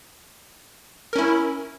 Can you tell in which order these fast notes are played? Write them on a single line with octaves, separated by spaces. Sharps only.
A#4 C#4 E4